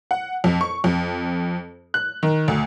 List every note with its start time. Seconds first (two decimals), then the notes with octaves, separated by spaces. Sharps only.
0.11 F#5
0.44 F2
0.61 C#6
0.84 F2
1.94 F#6
2.23 D#3
2.48 D2